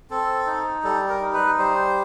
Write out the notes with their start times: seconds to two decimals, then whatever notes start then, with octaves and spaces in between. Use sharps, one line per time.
0.11 C4 A4
0.47 D#4
0.84 G3 A4
1.09 A#4
1.21 D#4
1.34 B4
1.58 G3 C5